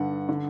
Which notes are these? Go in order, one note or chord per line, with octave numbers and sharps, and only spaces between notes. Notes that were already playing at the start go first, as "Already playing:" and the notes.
Already playing: G2 D3 F#5
D3